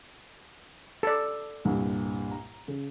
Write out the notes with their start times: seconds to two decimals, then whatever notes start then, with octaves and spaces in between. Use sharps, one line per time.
1.03 A4 D5
1.65 C2 G2 A#2
2.32 A#5
2.68 C#3